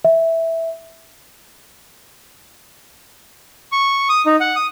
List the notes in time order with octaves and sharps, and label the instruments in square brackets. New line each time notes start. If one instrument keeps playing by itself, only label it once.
[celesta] E5
[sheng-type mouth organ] C#6
D#6
D#4
F#5
D#6